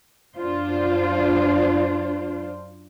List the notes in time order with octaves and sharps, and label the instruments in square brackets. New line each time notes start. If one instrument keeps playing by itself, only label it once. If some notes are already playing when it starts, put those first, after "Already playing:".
[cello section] F#2 D4 F4 C5